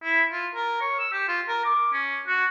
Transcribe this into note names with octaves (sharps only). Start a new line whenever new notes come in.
E4
F4
A#4
C#5
E6
G4
F4
A#4
D6
C#4
F#4